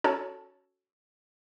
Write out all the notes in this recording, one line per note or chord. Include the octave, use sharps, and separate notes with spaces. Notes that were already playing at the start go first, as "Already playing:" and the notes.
C#4 F#4 A4 C#5 A5